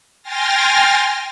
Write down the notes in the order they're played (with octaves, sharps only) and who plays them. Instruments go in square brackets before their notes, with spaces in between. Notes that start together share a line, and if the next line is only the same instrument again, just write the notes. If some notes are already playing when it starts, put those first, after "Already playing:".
[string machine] G5 G#5 C6 F6 A6 A#6